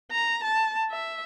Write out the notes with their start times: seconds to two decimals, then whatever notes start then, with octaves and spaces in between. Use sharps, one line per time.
0.11 A#5
0.44 A5
0.92 E5